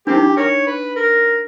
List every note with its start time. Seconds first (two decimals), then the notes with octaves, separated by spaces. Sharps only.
0.07 A#3 C4 D4 G4
0.15 D#4
0.23 D4
0.37 A#4 C#5
0.67 B4
0.96 A#4